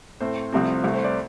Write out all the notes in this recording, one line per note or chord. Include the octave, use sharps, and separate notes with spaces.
A2 A3 C4 C5
C2 C3 F3 A3 C4
C2 C3 A3 C4
C5
D5